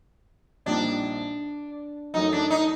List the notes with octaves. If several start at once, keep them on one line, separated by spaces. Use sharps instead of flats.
A#1 A#2 G3 C4 D4 D#4
F#2 F#3 A3 D#4
D4
D#4